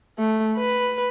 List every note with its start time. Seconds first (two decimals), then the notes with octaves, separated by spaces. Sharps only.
0.18 A3
0.57 B4